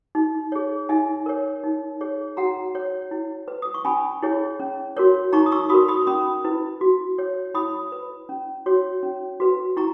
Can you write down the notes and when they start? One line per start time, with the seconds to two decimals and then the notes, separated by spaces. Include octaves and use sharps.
0.15 D#4
0.52 G#4 C#5
0.89 D#4 E5 G#5
1.26 A#4 C#5
1.63 D#4
2.01 G#4 C#5
2.37 F#4 F#5 A#5
2.75 C#5
3.11 E4
3.48 B4
3.62 D#6
3.74 C#6
3.85 C#4 G#5 B5
4.23 E4 G#4 C#5
4.60 C#4
4.97 F#4 A#4 C#5
5.33 D#4 A#5 C#6
5.46 D#6
5.52 C#6 E6
5.70 F#4 A#4 B5 D#6
5.88 B5 D#6
6.07 C#4 B5 D#6
6.45 E4 B4
6.81 F#4
7.19 C#5
7.54 E4 B5 D#6
7.92 B4
8.29 C#4
8.66 F#4 C#5
9.03 C#4
9.40 F#4 B4
9.77 E4 A#5 C#6